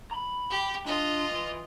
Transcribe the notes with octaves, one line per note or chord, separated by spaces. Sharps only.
A#5 B5
G4
D4 F4 D#5
E3